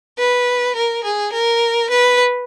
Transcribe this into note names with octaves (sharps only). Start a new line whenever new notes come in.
B4
A#4
G#4
A#4
B4